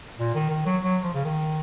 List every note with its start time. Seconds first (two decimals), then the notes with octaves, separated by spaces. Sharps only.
0.19 A#2
0.35 D#3
0.50 D#3
0.66 F#3
0.82 F#3
1.03 F3
1.14 C#3
1.25 D#3